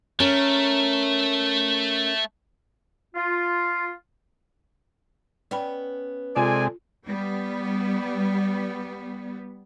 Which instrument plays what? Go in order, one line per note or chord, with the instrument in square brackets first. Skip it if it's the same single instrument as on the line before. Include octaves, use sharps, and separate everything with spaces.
[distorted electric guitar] A3 [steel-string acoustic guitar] C#4 A#4
[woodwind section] F4
[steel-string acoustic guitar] B3 C#4 [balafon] D5 G5 B5
[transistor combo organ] C3 G#3 [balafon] F4 [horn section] A4 D5 G#5
[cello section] G3 B3